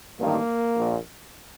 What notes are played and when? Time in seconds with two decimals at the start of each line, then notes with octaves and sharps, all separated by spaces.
0.19 A1 G2 D#3 A#3
0.77 A#1 A#2